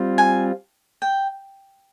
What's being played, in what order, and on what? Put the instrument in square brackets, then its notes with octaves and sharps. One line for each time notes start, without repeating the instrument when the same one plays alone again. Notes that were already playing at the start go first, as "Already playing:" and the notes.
Already playing: [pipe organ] G3 C4 F4
[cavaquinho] G#5
G5